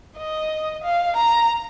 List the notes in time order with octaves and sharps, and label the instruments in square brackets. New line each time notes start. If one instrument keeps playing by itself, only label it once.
[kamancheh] D#5
F5
A#5